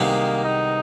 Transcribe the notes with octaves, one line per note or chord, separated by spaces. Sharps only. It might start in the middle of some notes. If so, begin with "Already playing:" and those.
Already playing: C2 C3 D#3 G#3 A#3 B3
D#4